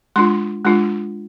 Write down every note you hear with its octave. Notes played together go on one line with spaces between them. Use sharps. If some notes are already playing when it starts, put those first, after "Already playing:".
G#3 D4 F4 C6
G#3 D4 F4